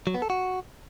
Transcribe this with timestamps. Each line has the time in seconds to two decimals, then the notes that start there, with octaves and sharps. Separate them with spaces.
0.07 F#3
0.14 B3
0.22 A4
0.30 F#4